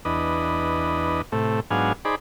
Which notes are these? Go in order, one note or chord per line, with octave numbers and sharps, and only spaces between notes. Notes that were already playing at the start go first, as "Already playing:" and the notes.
E2 D4 B4 D#5
A2 C3 A3
G#2 F#3 B3 D4 F5 G#5
D#4 G#4 C5 D5 B5